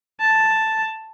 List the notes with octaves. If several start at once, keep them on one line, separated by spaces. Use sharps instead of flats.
A5